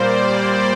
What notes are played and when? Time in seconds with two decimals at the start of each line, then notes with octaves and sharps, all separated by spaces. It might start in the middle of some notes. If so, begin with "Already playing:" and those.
Already playing: A#2 G3 A#3 C5 D5
0.37 D5